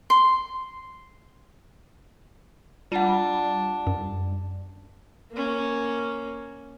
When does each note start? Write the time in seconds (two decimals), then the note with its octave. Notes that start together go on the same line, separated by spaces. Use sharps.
0.10 C6
2.92 G3 D4 F4 F#5
3.87 F#2
5.32 A#3 C#4